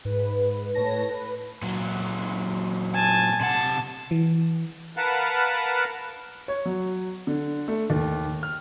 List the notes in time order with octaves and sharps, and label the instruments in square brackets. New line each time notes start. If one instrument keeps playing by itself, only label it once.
[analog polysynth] G#2 B4
A2 B4 C#5 A5 A#6
B4
[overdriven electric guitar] A#2 F#3
[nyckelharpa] G#5 A5
[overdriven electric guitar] C3 F#5 [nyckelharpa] A5
[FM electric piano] E3
[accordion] A#4 B4 F5 F#5 A5
[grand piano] C#5
F#3
D3
A3
D#2
F6